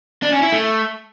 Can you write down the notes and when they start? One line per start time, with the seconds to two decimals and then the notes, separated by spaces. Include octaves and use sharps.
0.22 D4
0.32 C#4
0.42 E4
0.52 A3